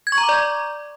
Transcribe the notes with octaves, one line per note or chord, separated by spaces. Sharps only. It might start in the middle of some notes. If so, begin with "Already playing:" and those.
G#6
C#6
A#5
D6
D5